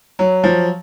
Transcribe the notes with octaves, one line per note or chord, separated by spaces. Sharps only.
F#3
F3